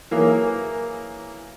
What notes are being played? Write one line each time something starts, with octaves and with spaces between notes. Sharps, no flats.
E3 F#3 A#3 G#4